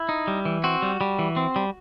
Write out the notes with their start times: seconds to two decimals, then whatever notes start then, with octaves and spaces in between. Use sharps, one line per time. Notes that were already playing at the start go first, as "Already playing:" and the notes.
Already playing: E4
0.09 D#4
0.28 G3
0.45 E3
0.64 C4 F#4
0.82 G3
1.01 G3
1.19 E3
1.36 C4
1.56 G3